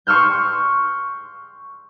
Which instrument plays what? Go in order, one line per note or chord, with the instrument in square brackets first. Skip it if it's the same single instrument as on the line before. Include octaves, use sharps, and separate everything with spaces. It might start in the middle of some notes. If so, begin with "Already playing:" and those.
[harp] C6 C#6 E6 F6 G6